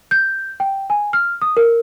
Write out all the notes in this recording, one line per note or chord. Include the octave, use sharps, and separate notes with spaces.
G6
G5
G#5
F6
D#6
A#4